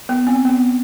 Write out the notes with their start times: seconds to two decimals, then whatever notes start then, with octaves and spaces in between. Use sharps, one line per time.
0.09 B3
0.27 C4
0.45 B3